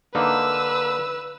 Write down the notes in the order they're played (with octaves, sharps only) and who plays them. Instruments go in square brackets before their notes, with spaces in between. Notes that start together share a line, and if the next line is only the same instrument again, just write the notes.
[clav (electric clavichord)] D3 A#3 D#4 [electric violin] B4 E6